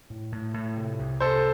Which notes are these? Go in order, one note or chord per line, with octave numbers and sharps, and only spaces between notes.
A2
A2
A2
C3
C2
C3 A4 C5